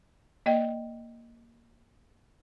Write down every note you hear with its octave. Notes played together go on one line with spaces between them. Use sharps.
A#3 D5 D#5 G5